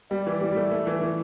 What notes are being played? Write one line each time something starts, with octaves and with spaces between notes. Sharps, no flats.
G3 D5
E3
G3
G3
A3
A3
E3
E3